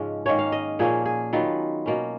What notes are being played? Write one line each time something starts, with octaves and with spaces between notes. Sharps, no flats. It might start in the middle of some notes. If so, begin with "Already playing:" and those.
Already playing: G#2 C#3 F3 G#3 C#4
G#2 D#3 A#3 C#4 C#5
F5
D#5
A#2 F3 A#3 C#4 G#4
G#4
D#3 F#3 B3 F4
B2 A#3 C#4